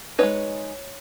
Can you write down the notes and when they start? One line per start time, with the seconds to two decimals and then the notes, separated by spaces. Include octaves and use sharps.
0.18 G#3 C4 D#4 B4 C#5